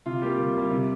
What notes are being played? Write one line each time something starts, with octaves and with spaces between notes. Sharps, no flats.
C3 F4
G3 A#3 G4
C3
G3 A#3
C3